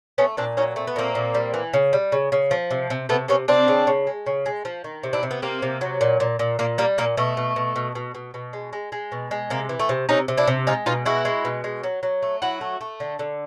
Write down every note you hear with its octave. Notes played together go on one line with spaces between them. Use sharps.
A3 B3 C#4
A#2 C4 D4
F#3 C#4 D#4
A3 C4
B3
A#2 A#3 C4
A#2
G3
E3
C#3
G3
C#3
C#3
F3
C3
C3
C3 A3 B3
C3 B3 C#4
C3 C4 D4
C#3
C#3
G#3
C#3
G#3
F3
D#3
C3
D4 E4
C3
B3
C3 A#3 C4
C3
F#3
A#2
A#2
A#2
A#2 A#3
G3 A#3
A#2 A#3
B2 A3
B2
B2
B2
B2
B2
B2
G#3
G#3
G#3
B2
G#3
C3 A#3
E3
A3
C3
C3 C#4 D#4
C3
D4 E4
C3
G#3 D#4 F4
B2 D#4 F4
G#3 E4 F#4
G#3
B2
G#3
F#3
F#3
A3
F#3 E4 F#4
A3
A3
D3
D3